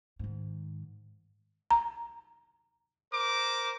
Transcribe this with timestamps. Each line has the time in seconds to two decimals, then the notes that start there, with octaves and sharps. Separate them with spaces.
0.19 G#2 D#3
1.71 A#5
3.13 A#4 C5 D6